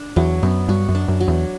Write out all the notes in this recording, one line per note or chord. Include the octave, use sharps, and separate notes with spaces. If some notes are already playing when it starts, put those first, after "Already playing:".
Already playing: D4
E2 F#3
F#2 B3
G2 F#4
F#2
D4
F#2
F#3
E2